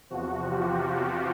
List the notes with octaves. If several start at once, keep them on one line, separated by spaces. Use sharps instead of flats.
E2 C3 F3 F#4
F4 G4